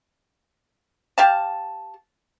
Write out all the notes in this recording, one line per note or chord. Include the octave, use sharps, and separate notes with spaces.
G4 F5 A5